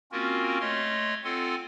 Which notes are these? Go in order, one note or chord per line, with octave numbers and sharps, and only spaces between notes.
A#3 C4 C#4 F4 F#4 A#4
A3 C#5 D#5 C6 F6
C4 F4 A4 F#5 G#5 C6